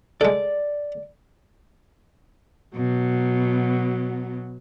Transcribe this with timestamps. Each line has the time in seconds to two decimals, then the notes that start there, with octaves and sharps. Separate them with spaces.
0.21 G#3 A4 D5
2.75 B2 F#3